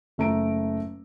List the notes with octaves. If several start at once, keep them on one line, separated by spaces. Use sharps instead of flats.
F#1 A3 A#5 D7